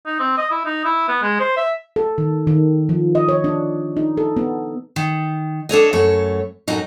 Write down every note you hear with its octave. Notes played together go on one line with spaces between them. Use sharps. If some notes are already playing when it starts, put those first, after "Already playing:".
D#4
C4
D#5
E4
D#4
E4
B3
G#3
C5
E5
A4
D#3
D#3
F3
D#5
C#5
D4
D#4
A4
B3
D#3
D4 A4 C#5 D#5
F#2 F#3 A3 C#5
F#2 A2 F#3 D#4